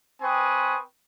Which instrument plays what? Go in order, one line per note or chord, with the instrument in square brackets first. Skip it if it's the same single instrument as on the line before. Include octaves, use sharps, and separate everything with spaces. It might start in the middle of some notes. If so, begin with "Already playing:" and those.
[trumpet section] C4 B4 G5 G#5 C#6 D#6